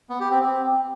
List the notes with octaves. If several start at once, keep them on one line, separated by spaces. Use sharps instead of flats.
B3
G4
C4
C4